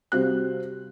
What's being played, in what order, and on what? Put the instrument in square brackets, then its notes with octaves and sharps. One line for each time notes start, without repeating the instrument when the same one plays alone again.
[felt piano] C3 G3 F#4 C5 F5 F#6